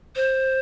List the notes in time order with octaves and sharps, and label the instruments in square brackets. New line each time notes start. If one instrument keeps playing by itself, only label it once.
[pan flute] C5